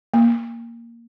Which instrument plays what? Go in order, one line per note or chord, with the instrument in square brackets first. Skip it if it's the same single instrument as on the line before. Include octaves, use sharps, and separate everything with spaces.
[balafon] A#3